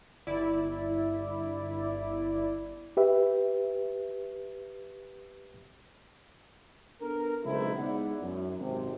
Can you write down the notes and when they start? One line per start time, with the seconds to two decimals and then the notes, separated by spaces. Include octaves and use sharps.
0.27 G1 E4 D5
2.97 G4 B4 E5
7.01 B3 D4 A4 A#4
7.44 B1 C#3 G#3 C4 D#4 E4
7.78 G#3 B3 D#4 E4 D5 F#5
8.22 F#2
8.59 G#1 C3